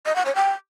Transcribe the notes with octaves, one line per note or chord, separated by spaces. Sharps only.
D#5
F#5
C#5
G5